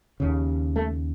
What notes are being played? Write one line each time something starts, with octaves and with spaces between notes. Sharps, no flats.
D#2 C#3
A3